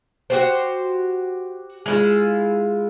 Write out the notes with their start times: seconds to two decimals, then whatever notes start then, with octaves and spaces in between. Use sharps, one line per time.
0.30 F#4 G4 C5
1.86 G#3 E4 F4